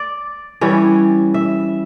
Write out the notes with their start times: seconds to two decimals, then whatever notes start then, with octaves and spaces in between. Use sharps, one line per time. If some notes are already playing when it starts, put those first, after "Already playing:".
Already playing: D5
0.61 E3 G3 C#4
1.34 E5